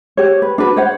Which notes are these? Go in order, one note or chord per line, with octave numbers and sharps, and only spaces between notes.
G4 C#5
B4
D4 F#4 B4
C5 C#5 F#5